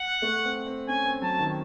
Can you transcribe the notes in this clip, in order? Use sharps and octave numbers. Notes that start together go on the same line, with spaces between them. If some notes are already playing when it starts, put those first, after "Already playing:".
Already playing: F#5
A3
C4
C4
C#4 G#5
C4
F#3 A5
D#3